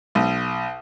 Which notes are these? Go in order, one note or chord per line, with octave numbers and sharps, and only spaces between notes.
B1